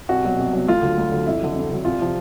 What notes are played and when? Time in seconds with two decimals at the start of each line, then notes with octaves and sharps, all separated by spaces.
0.09 C2 F#4
0.24 B2 F#3
0.39 C2
0.53 B2 F#3
0.68 D2 F4
0.82 D3 F#3
0.98 D2
1.12 D3 F#3
1.26 F2 E4
1.40 D3 F#3
1.56 F2
1.70 D3 F#3
1.85 C2 F4
2.00 C3 F3